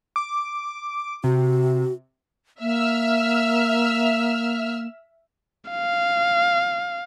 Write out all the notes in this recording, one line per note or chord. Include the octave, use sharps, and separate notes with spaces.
D6
C3 F#4
A#3 E5 E6 F6
F5